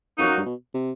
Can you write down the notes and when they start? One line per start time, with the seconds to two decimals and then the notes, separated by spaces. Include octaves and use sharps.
0.18 F2 F#3 A#3 D#4 F#4
0.27 F#2
0.38 G2
0.46 B2
0.74 C3